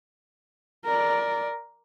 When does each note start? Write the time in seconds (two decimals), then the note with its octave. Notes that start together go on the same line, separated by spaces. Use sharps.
0.85 A#4 D5